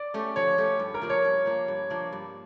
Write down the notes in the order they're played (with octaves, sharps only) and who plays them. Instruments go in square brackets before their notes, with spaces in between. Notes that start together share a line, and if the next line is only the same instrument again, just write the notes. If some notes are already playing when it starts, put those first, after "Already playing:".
Already playing: [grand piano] D5
[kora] A3 C#4 G4
[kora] F3 [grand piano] C#5
[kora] A3 C#4 G4
G2
[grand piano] A#4
[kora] F3 A#3 D4
[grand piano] C#5
[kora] G2
F3 A#3 D4
G2
F3 A#3 D4
G2